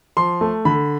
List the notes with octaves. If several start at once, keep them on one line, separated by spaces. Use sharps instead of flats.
F3 C6
A3
D3 B5